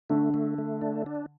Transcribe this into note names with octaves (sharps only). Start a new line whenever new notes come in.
D3 A3
A3
A3
D4
D4